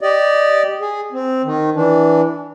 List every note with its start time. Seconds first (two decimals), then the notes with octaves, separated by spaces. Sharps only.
0.01 G4 D5 D#5
0.81 G#4
1.12 C4
1.44 D#3
1.75 E3 D4